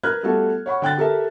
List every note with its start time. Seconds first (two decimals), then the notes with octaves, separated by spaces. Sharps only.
0.03 A#4 B4 F6 F#6 G#6
0.23 G3 A3 B3 F4 F#4 A4
0.66 C#5 F#5 B5 C#6
0.82 D3 G5 F#6 A6
0.97 G4 A4 A#4 E5